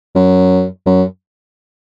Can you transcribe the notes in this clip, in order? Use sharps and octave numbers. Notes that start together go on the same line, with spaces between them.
F#2
F#2